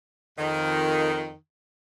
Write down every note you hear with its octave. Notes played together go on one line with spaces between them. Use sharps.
F2 D#3